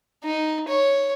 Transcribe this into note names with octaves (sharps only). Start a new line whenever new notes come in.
D#4
C#5